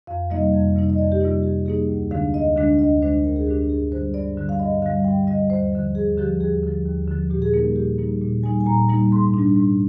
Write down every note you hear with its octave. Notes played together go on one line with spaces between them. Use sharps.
F2 F5
C3 G3 A#3 D#4 D#5
F2
C3 G3 A#3 D#4
D#5
F2 D5
G4
C3 G3 A#3 D#4 F4
F2 G4
C3 G3 A#3 D#4 G#4
D2
D3 G#3 D4 F5
D2 D#5
D3 G#3 D4
D2 D#5
D3 G#3 D4 C5
D2 A#4
G#4
D3 G#3 D4 G4
G2 G#4
D3 G3 C5
G2 D5
D3 G3
F5
G2 D#5
D3 G3 F5
G2 G5
D3 G3 D#5
D#2 C5
D3 F3
D#2 G#4
D3 F3 G4
D#2 G#4
D3 F3
D#2
D3 F3
A#2 G4
G#4
G3 A#3 D#4 A#4
A#2 G4
G3 A#3 D#4
A#2
G3 A#3 D#4 G#5
G#5
A#2 A#5
G3 A#3 D#4
G#2 C6
G3 D4
G#2